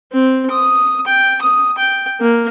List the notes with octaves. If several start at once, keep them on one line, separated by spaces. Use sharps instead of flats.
C4
D#6
G5
D#6
G5
A#3